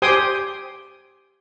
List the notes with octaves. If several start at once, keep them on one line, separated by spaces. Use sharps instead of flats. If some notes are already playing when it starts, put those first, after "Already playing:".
G4 C5 G5 G#5 C6 D#6